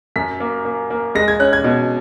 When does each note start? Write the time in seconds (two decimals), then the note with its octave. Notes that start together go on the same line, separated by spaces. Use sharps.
0.16 F#2 B6
0.40 A#3
0.65 A#3
0.90 A#3
1.15 G#3 A#6
1.28 G#6
1.40 C#4 F#6
1.53 G#6
1.64 B2